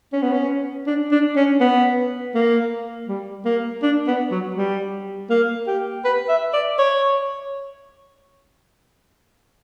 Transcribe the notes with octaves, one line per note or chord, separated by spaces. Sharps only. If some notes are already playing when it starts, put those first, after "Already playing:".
C#4
B3
C#4
D4
D4
C#4
B3
A#3
G3
A#3
D4
B3
F#3
G3
A#3
G4
B4
E5
D5
C#5